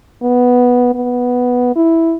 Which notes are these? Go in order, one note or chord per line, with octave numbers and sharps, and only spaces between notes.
B3
B3
E4